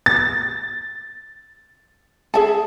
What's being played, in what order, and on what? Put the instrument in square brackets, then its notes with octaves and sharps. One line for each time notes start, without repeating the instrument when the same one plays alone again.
[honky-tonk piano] A6
[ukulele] G#4 E5 A5